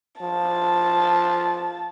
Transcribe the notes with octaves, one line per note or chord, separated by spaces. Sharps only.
F3 A5